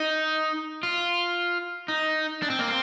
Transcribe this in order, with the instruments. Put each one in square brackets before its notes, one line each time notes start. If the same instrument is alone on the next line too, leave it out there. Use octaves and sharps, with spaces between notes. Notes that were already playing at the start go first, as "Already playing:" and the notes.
Already playing: [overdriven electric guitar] D#4
F4
D#4
D4
C4
A#3
C4